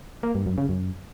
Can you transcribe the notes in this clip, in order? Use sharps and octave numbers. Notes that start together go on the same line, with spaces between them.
A#3
G2
F#2
C#3
F#2